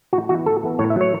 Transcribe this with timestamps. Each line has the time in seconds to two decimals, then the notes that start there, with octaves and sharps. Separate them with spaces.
0.13 A2 F#4
0.29 E3 B3 F#4
0.46 A2 A4
0.63 E3 B3
0.79 A2 C#5
0.90 E5
0.96 F#3 A3 C#5